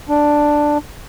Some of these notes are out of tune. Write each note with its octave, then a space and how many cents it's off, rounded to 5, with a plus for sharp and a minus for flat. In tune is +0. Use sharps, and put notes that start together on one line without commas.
D4 +5